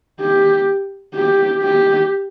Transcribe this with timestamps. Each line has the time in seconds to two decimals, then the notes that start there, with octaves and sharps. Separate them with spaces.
0.20 G4
1.15 G4
1.62 G4